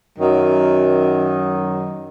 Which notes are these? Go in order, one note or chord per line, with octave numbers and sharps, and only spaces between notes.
F#2 D#3 F#3